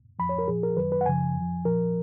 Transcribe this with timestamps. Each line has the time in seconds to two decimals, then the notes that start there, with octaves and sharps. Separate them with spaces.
0.19 F2 F3 B5
0.29 C#5
0.39 A#4
0.48 A#2 F3 G#4
0.63 A#4
0.77 F#2 D#3 F#3 B4
0.92 B4
1.01 F#5
1.06 F#2 C#3 F3 G#5
1.36 F2 F3
1.65 A#2 F3 A#4